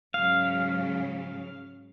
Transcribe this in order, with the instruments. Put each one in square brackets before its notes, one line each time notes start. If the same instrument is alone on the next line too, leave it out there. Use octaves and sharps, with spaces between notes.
[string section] G#2 C#3 F#3 [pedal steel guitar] F5